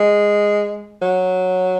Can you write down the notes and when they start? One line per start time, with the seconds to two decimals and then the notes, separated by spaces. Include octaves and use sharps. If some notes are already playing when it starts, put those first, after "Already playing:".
Already playing: G#3
1.02 F#3